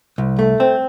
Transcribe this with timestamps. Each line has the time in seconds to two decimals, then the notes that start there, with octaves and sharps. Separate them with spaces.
0.18 C2
0.39 A3
0.60 C4